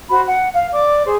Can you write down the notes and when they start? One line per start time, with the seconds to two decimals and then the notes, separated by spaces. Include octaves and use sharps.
0.09 F#4 C5 B5
0.26 F#5
0.53 F5
0.72 D5 D6
1.04 G#4 C5